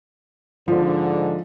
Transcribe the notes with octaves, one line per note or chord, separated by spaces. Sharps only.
G#2 D3 F3